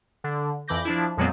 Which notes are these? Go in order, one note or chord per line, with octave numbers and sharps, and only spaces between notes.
D3
F2 E3 B5 D6 G6 A#6
F3 D4 E4
F2 A#2 F#3 G#3 B3 C4